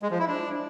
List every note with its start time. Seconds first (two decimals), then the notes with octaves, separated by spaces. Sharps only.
0.02 G#3
0.11 F3
0.19 E4
0.28 D4